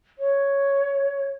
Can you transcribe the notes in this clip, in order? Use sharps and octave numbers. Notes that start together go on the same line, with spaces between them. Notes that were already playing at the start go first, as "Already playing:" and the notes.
C#5